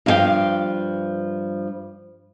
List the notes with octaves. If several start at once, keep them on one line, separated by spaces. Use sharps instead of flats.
G2 F3 F4 G4 F5 G5